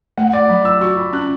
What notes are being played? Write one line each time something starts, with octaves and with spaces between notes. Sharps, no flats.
A3 F#5
D5
F#3 B5
E6
F#4 C#6
B5
C#4 F#6